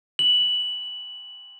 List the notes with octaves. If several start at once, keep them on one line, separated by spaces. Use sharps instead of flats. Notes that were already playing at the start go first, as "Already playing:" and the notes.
F#7